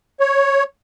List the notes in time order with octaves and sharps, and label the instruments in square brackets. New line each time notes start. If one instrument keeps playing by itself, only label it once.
[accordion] C#5